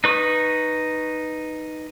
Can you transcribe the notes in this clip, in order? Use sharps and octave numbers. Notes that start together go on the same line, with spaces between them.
D#4 B4 C#6 D#6